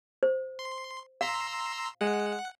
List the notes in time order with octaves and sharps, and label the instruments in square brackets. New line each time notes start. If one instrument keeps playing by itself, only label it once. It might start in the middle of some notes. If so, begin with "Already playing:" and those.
[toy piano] C5
[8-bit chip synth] C6
[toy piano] F5 [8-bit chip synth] A#5 C6 E6
[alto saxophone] G#3 [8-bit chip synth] F#5